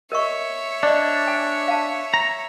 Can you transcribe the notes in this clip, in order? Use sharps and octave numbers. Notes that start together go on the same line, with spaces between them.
A#4 C#5 D#5 E5 C#6
D4 D5 D#5
G#5
F5 A5
A#5